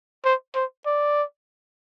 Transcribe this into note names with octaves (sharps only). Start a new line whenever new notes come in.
C5
C5
D5